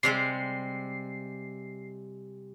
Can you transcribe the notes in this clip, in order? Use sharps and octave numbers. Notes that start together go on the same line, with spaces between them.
C3 G3 G#3 C7